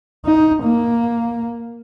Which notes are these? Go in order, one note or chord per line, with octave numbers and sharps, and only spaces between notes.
D#4
A#3